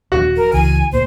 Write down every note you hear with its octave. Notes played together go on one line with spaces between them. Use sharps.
D#1 F3 F#4
A#4
C#2 E3 G#5
D2 A#2 C5